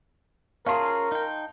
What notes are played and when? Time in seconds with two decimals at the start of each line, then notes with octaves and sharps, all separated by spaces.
0.67 C#4 F4 G#4 A#4 F5 A5 C6
1.12 D#4 G5